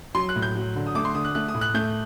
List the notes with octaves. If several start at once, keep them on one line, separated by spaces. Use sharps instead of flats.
F#3 C6
F#6
A2
G6
F#3
D3
D#6
A3 D6
C6
D3 D#6
F#6
A3 F#6
D#6
A2
F#6
A3 G6